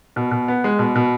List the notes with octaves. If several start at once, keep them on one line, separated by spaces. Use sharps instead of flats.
B2
B2
B3
G#3
B2
B2